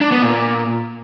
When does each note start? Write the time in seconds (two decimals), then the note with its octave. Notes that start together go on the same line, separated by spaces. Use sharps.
0.01 D4
0.12 B3
0.22 A#2